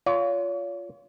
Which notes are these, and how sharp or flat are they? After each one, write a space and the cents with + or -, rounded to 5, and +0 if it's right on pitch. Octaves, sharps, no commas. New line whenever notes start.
F4 +0 C#5 +40